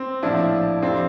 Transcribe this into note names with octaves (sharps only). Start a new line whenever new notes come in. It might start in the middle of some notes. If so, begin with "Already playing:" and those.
Already playing: C4
A#1 A2 F3 D4 E4
F2 C3 F3 C4 D4